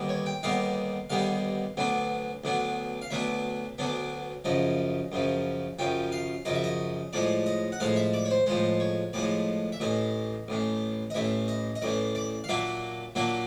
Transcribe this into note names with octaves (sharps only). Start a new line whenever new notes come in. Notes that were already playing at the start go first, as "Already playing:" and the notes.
Already playing: D#2 D3 G3 B3 D#4
C#5
G5
D#2 D3 G3 B3 D#4 F5
D#2 D3 G3 B3 D#4 F5
D2 D3 F#3 B3 D4
D2 D3 F#3 B3 D4
F5
D2 D3 F#3 B3 D4 E5
D2 D3 F#3 B3 D4
F#2 C#3 F3 D#5
F#2 C#3 F3
F#2 C#3 F3 G5
F5
F#2 C#3 F3 D#5
E5
D#5
A2 F3 G#3 D5
D#5
F#5
A2 F3 G#3 F5
E5
D5
C#5
C5
A2 F3 G#3 C5
C#5
A2 F3 G#3 D5
E5
A1 A2 E3 D#5
A1 A2 E3
D#5
A1 A2 E3 E5
D#5
D#5
A1 A2 E3 D5
D5
F5
A#2 F#3 A#3 D4 E5
A#2 F#3 A#3 D4 E5